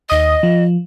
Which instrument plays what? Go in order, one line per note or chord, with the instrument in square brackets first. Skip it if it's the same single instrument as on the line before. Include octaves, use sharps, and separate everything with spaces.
[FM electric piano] D#2 D#6 [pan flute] D#5
[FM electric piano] F3